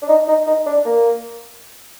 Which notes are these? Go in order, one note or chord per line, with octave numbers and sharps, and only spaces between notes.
D4
D#4
D#4
D#4
D4
A#3